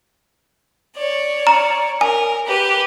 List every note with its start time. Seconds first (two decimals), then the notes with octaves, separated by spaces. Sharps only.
0.95 C#5 D5
1.47 A#5
2.01 A#4 G#5
2.46 G4 B4